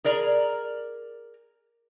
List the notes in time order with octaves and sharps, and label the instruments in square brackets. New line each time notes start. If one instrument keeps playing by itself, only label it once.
[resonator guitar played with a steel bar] G#4 A#4 D5 A#5